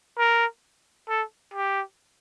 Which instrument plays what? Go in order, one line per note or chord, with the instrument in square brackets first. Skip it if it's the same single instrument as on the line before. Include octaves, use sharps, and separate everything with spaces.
[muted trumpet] A#4
A4
G4